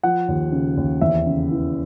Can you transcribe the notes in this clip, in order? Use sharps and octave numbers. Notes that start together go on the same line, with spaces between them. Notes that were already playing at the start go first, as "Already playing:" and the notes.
F3 F#5
D#2
C#3
D#2
E2 E5
C#3
E3